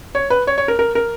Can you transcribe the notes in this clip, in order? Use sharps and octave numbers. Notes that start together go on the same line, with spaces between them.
C#5
B4
C#5
C#5
A#4
A#4
A#4